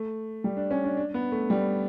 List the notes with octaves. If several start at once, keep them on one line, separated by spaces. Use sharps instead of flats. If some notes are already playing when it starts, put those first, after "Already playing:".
Already playing: A3
G3
D4
C#4
D4
D4
B3
A3
G3